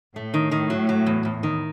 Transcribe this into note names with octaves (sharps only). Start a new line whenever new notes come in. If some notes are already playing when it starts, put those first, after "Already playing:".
A2 A3
D#3
D#3
F#3
F#3
E2
E2
D#3